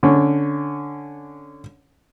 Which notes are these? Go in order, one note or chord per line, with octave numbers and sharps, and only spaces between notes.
D3 C#4